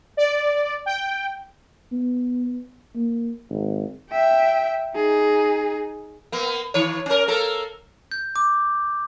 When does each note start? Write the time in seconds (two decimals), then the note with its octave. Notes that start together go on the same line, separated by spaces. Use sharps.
0.17 D5
0.86 G5
1.92 B3
2.95 A#3
3.49 G#1
4.10 E5 G5
4.95 D#4 G#4
6.32 A#3 B3
6.74 D#3 C#5
7.06 C#4 A#4
7.28 A#3 A4 A#4
8.11 G6
8.36 D6